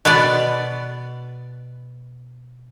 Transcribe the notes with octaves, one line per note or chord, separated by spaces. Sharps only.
B2 B3 B4 D5